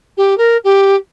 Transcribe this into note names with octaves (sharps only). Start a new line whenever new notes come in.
G4
A#4
G4